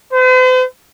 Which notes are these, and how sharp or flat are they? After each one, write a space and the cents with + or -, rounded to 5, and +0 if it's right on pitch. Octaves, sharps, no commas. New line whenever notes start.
C5 -45